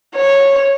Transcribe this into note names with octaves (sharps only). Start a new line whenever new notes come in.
C#5